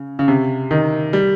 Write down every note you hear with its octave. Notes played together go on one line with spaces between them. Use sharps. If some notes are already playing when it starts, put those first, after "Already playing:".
Already playing: C#3
C#3
C3
D#3
G3